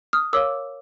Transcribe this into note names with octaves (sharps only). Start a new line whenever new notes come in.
D#6 F6
A#4 C#5 F5 D6 E6